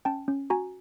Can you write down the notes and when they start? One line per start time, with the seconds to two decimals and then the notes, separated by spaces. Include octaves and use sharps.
0.05 C#4 G5 A5
0.28 C#4
0.50 F#4 G#5 A#5